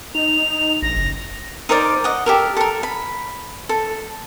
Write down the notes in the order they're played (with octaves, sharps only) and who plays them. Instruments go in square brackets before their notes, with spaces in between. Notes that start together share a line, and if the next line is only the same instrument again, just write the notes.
[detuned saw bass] D#4 [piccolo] F7
[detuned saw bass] A#1 [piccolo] A#6
[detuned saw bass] F#1
[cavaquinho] D#4 A#4 C5 D5
D#5 F#5
G4 A4 A#4
A4 A#4
B5
A4